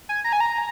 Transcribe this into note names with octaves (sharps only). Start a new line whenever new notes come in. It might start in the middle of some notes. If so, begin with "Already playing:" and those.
G#5
A#5
G#5
A#5